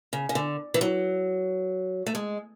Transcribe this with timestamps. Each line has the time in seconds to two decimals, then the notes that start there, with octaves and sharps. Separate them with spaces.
0.13 C#3
0.29 C#3
0.35 D3
0.74 E3
0.81 F#3
2.06 A3
2.15 G#3